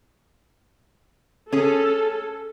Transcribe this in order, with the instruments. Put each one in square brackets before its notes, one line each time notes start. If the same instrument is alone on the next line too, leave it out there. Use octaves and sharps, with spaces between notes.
[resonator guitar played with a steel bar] C#4 G#4 [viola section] A4